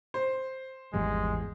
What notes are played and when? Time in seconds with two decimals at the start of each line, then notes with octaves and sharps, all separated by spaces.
0.14 C5
0.94 G#1 E2 G#2 F3 G3 G#3